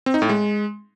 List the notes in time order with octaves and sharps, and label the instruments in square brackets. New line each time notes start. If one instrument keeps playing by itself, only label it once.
[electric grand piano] C4
D#4
A2
G#3